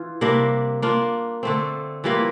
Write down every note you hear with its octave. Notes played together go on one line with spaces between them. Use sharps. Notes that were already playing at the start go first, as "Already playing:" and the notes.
Already playing: E3 F4
C3 G3 A#3 D4
A#3 D4 F4
D3 A3 C4
E3 G3 A#3 F4